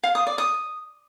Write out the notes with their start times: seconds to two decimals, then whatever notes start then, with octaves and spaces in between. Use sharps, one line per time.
0.04 F5
0.15 D#6
0.27 D5
0.38 D#6